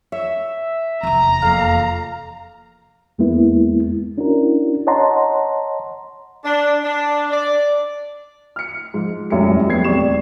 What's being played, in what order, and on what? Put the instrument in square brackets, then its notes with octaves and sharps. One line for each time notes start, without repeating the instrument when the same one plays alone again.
[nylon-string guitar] C#5 [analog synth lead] E5
[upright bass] F1 E2 [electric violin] A#5
[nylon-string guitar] F2 A#3 [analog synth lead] F5
[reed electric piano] E2 G#3 A#3 B3 E4
C#4 D4 E4 F#4 A#4
C#5 D#5 F#5 A5 A#5 C6
[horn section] D4
D4
D5
[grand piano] F6 C#7
G#2 F3
E1 F#2 A2 G3 C#7
F2 G3 A3 B3 G#6 C7
E1 A1 C4 D5 C#6 E7